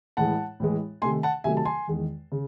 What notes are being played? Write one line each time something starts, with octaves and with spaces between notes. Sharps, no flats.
A2 E3 G#3 F#5 A5
A2 E3 G#3
C3 D#3 A3 G#5 C6
F#5 A5
C3 D#3 F#3 A3 E5 G#5
A5
G#5 C6
E2 D#3 G#3
C#3